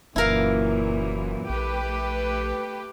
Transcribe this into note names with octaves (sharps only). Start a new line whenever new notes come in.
F1 F#2 A#2 E3 E4 A#4 F5
A#1 A3 G4 B4